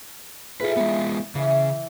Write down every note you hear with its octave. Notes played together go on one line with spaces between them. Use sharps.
E4 F4 G#4 A4 B4
G#3 B3
C#3 E3 E5